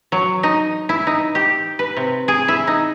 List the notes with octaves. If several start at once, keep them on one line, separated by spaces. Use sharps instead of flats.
F#3
D#4
E4
D#4
G4
B4
C3
G#4
E4
D#4